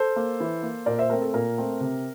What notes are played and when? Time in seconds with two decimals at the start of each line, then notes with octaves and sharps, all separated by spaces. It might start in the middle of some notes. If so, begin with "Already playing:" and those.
Already playing: A4 C5
0.16 A#3
0.40 E3
0.63 A#3
0.86 A#2 A#4 D5
0.99 C5 E5
1.10 A3 C4 A#4
1.22 A4
1.34 A#2 A#4
1.58 A3 C4
1.80 C3